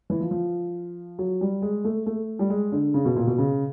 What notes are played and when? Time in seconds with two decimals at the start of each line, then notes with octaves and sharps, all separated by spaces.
0.10 E3
0.20 F3
0.31 F3
1.19 F#3
1.41 G3
1.62 G#3
1.84 A3
2.06 A3
2.39 G3
2.50 G#3
2.72 D3
2.94 C#3
3.05 B2
3.16 A#2
3.27 B2
3.38 C#3